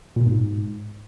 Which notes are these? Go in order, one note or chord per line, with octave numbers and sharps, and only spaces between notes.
A#2
B2
G#2